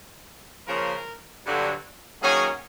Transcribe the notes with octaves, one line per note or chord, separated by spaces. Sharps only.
C#3 F3 A#3 C#4 A#4
G2 D3 F#3
D#3 F#3 A#3 C#4 G#4